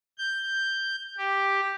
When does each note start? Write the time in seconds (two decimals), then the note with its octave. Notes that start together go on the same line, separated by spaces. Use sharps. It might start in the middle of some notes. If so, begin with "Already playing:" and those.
0.18 G6
1.18 G4